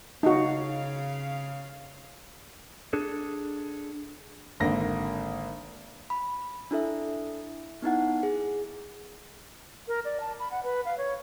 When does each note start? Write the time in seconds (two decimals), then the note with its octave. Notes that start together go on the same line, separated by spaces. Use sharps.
0.23 C#3 D#4 F#4 F5
2.93 D4 G#4 A4
4.60 G#1 D3 A#3 A#6
6.10 B5
6.71 D4 E4 A4 E5
7.82 B3 D#4 E4 F#5
8.23 G#4
9.88 A#4
10.05 D5
10.20 A5
10.39 B5
10.51 F#5
10.63 B4
10.85 F5
10.98 C#5